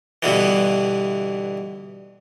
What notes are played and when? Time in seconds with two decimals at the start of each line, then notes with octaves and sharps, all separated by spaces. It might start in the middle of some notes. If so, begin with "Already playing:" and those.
0.23 G2 B2 D3 E3